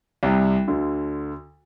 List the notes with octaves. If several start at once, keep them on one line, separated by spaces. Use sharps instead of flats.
C2 C3
D2 D3